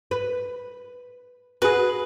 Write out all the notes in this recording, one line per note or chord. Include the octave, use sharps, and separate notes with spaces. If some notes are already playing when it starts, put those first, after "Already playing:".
B4
F#4 G#4 B4